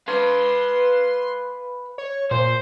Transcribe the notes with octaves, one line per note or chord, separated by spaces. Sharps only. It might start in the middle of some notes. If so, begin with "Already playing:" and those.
B4 F5 C6
C#5
A#2 C5